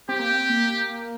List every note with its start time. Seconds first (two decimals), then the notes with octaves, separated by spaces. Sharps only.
0.08 C4 G4
0.19 A#3
0.30 C4
0.49 A#3